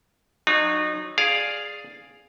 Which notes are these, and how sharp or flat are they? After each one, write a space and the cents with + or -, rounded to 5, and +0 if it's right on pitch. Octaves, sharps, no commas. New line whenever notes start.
F#3 -10 D#4 -30 A#5 +45
G#4 +0 D5 +0 F5 +0